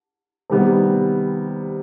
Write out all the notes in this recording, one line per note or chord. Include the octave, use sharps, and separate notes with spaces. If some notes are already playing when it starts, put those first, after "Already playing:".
C3 D#3 G3 B3